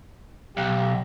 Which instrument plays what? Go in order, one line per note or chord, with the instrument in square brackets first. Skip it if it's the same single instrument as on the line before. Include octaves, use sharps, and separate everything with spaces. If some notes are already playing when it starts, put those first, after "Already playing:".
[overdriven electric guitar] B1 [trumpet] G4